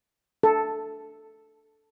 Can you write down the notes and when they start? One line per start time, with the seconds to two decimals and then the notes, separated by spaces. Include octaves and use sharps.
0.43 A4